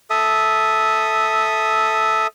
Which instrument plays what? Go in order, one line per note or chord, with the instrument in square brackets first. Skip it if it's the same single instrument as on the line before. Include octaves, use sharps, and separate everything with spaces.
[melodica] A4 E5 D#6